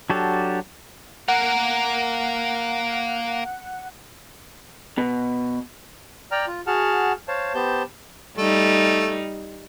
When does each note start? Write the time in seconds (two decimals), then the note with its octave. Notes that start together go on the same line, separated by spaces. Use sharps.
0.10 F#3 D4 F#4 G4 A4
1.28 A#3 A#4 F#5
4.98 B2
6.32 D5 G5 A#5 F6
6.47 F4
6.67 F#4 G#4 F#5 A5 F6
7.28 C5 C#5 F5 A5
7.55 B3 G4 C5 A5 G6
8.37 G3 A3 D#4